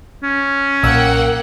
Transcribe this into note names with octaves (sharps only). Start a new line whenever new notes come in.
C#4
B1 A#2 A#3 F#5 G5 E6